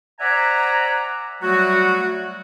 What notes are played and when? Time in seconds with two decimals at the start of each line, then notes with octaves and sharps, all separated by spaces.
0.20 C5 D5 E5 F#5 G#5 A#5
1.42 F#3 G3 A3 F#4